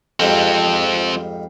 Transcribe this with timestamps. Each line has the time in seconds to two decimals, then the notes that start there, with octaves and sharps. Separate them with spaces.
0.20 F2 G#2 F3 G3 C4